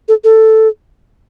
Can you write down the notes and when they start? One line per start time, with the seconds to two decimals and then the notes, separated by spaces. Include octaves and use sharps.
0.08 A4
0.24 A4